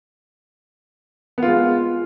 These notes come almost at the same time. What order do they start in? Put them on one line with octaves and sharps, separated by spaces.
B3 F4 G#3